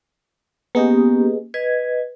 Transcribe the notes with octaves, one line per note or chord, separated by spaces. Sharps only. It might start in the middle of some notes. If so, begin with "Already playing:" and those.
A#3 B3 C#4 G4 G#4 D#5
B4 D#5 G#6